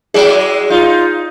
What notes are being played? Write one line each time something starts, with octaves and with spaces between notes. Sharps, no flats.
F#3 G#3 E4 G#4 D5 G5
D#4 F4